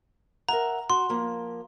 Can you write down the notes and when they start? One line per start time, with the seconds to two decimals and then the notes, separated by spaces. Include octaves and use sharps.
0.49 A#4 E5 F#5 A#5
0.90 F#4 C6
1.09 F3 A#3